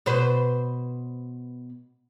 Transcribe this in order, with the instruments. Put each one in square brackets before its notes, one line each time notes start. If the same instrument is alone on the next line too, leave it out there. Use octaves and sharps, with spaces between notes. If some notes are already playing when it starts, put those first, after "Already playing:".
[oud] B2 B4 C5